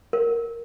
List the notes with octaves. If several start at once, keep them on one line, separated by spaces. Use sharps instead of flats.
A#4